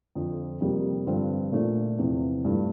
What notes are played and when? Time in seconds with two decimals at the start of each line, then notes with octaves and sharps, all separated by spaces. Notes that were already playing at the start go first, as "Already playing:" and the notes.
0.15 F2 D3 F3
0.61 F2 C3 G3 A#3
1.07 G2 D3 F3 C4 F4
1.52 A#2 A3 D4 F4
1.98 E2 C3 F3
2.45 G2 F3 A3 E4